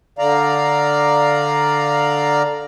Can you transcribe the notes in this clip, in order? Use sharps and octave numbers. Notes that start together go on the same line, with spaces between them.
D3 D5 F5 A#5